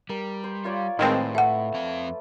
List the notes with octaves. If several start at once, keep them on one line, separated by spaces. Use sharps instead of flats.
G3 A#4
C5
F4 C#5 D5
A2 D#3 G#3 C4 B4 A5
A3 E5 F#5
F2 C4 F5